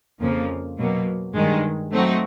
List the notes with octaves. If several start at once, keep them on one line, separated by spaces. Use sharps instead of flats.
F2 C#3 F3 A#3
B2 F#3 A#3
G2 D#3 G#3
F#3 A3 C4 D#4 F#4